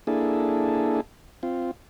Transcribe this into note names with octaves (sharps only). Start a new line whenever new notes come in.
A#3 D4 E4 G#4 A4
C4 F4